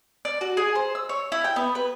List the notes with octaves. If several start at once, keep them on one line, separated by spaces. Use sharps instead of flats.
D5
F#4
G#4
C5
E6
C#5
E4
G5
B3
B4